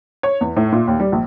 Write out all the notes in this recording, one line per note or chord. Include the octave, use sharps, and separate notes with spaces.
C#5
E2
A2
A#2
D#2
G3
A#1